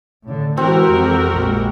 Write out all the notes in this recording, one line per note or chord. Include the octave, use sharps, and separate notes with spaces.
A2 D3
E3 G#3 C4 F#4 G4 A#4
F2
A#1 G#3